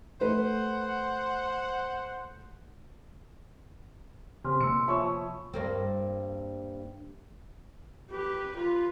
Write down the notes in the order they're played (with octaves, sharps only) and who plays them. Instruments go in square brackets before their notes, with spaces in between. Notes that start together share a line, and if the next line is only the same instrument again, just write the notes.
[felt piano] A3 B4 [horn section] C5 F#5
[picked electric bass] C#3 [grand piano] C4 G4 [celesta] G#5 C6 F6
[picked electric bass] C3 A#3 [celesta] G#5 C6 E6 [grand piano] C#7
[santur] F3 C#5 [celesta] E5 G#5 [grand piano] B5 C#6 E6
[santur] D#6
[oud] G2 A#3 C4
[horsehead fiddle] G4 B4
F4 B4